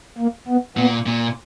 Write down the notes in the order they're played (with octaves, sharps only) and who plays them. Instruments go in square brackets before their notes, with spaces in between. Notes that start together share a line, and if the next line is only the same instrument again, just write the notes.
[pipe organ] A#3
B3
[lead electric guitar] A#2 [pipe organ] B3
[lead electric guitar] A#2